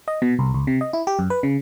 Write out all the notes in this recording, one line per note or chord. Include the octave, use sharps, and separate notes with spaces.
D#5
B2
C2
C#2
C3
D#5
E4
G4
F#2
B4
C#3